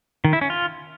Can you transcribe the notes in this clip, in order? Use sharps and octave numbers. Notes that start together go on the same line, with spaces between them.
D#3
E4
C#4
F4